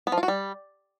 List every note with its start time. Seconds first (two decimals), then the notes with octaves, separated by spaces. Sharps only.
0.07 B3
0.12 F3
0.18 F4
0.23 F#4
0.28 G3